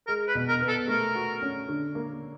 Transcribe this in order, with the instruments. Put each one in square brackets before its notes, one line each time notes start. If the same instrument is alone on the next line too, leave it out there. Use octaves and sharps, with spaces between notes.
[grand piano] G#3 [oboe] A#4
[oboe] B4
[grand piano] B2
[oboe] A#4
[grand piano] B3
[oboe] A4
[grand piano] A3 [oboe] A#4
[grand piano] F#4
C#4
D3
A#3